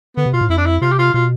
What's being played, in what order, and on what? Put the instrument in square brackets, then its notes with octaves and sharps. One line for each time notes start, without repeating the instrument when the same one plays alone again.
[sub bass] D3 [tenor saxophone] B3
[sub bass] C3
[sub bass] B2 [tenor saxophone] F4
[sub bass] A2
[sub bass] F2 [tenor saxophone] E4
[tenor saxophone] D4
E4
[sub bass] C3 [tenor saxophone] F4
[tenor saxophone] G4
F4
[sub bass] B2 [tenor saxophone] F4